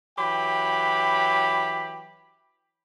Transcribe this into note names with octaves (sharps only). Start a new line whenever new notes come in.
E3 F#3 G4 G5 B5